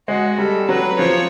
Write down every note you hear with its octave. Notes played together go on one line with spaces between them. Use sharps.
G#3 F#4
G3 A4
F#3 B4
F3 C#5